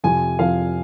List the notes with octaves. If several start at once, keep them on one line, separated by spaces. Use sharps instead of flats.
F2 C3 F3 G#5
F2 C3 F3 F5